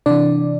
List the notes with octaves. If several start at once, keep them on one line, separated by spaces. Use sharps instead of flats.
C3 E3 D4 D5